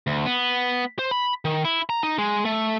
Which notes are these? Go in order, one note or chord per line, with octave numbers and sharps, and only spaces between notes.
D2
B3
C5
B5
D#3
E4
A#5
D#4
G#3
A3